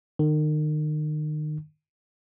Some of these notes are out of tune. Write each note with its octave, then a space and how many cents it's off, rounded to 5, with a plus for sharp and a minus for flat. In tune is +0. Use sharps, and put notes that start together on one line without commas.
D#3 -35